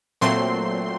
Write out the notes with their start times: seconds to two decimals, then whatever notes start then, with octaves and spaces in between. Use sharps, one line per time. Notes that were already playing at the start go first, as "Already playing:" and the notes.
0.21 A#2 F#3 A3 C4 C6